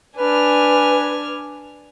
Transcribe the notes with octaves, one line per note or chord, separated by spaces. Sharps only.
D4 B4 G#5 F6